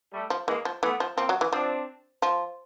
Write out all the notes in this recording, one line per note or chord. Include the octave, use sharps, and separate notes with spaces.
G3 A3
F3
E3 G#3 A#3
F3
E3 A3 B3
F3
F3 A#3 C4
F#3
E3
F3 C4 D4
F3